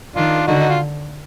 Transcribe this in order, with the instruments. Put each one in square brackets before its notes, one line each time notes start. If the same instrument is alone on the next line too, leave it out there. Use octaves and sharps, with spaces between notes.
[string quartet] D#3 [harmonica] D4 F4
[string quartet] D3 [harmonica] D#4 F#4
[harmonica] D#4
F4